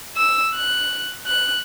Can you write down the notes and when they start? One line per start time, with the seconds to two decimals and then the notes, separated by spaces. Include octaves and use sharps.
0.17 E6
0.56 F#6
1.26 F#6